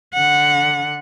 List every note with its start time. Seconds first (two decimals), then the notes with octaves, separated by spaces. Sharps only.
0.14 D3 F#5